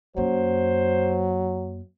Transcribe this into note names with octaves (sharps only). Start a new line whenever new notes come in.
F#2 F#3 A#3 C5